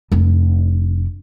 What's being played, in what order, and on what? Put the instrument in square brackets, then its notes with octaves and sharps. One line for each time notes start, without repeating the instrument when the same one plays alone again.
[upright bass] F1 D4